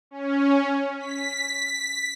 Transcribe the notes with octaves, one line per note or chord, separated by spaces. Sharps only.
C#4
B6